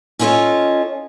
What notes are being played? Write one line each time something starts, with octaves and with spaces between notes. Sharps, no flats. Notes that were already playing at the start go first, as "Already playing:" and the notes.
C#4 E4 F4 A4 C#5 D#5